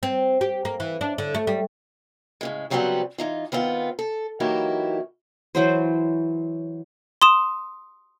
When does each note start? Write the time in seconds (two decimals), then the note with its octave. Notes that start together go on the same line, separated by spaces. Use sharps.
0.03 C4
0.41 G4
0.65 A#3
0.80 E3
1.01 D4
1.18 D3
1.35 A3
1.47 G3
2.41 A2 C#3 G#3
2.70 C#3 F#3 G3 B3 C4 F#5
3.18 E3 D#4 F4
3.52 D#3 B3 C4 F4
3.99 A4
4.40 E3 F#3 A#3 D#4 E4 G4
5.55 E3 F#3 C5
7.22 C6 D#6 E7